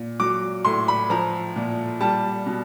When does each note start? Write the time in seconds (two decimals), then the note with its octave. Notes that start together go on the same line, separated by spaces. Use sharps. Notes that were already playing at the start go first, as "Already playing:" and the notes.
Already playing: A#2
0.20 F#3 D6
0.65 A2 C6
0.88 B5
1.10 F3 A#5
1.56 A#2
2.00 G3 A5
2.46 B2